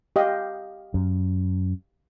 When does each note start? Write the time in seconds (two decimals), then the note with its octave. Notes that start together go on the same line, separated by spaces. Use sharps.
0.16 G4 D#5 F5
0.94 F#2